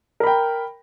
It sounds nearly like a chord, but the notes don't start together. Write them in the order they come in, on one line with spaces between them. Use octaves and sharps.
A#4 B5 G5